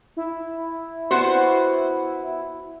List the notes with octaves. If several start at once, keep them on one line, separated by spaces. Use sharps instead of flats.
E4
B3 F#4 C5